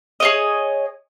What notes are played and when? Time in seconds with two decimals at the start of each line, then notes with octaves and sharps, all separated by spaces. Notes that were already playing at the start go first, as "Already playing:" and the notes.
0.20 G#4 C#5 D#5